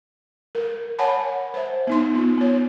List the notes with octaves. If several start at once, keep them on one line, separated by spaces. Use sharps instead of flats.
A#4
C#5 F#5 G#5 A5 B5
C5 E5
B3 D#4 C6
B3 F4
B3 C#5